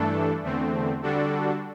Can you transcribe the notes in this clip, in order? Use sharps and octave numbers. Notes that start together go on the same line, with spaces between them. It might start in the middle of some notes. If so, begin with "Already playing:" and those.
Already playing: G2 E3 A3 D4 A4
E2 D3 A3 C4
D3 G3 D4 F#4 A4